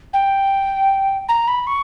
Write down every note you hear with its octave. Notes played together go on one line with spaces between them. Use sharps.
G5
A#5
B5
C#6